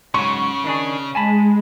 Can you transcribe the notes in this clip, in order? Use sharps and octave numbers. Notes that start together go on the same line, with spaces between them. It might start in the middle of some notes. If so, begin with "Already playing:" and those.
G#2 C#3 F#3 C#6
D#3 D4 G#4
G#3 G#5 A5 B5